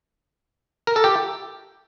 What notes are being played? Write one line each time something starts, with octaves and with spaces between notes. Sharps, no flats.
A#4
A4
G4